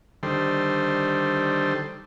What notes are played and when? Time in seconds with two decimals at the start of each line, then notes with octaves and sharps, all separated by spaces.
0.23 D3 D#3 G3 A4 C5